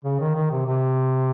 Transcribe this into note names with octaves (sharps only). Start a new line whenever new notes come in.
C#3
D#3
D#3
C3
C3